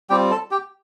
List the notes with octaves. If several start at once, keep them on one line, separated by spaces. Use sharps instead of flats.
G3 C4 F4 G4 G5
A4 A5
G4 G5